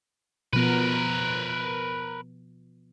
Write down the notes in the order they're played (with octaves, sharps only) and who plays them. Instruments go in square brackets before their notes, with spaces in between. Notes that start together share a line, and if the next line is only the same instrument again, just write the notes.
[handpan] B2 F3 B3 [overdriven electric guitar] A#4 B4